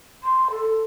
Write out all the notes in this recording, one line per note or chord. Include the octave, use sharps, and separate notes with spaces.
C6
A4